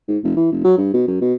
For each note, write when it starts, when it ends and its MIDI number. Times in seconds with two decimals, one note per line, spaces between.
0.08 0.18 44
0.24 0.35 29
0.36 0.51 52
0.52 0.64 29
0.64 0.74 54
0.78 0.90 43
0.94 1.06 47
1.08 1.19 42
1.21 1.34 47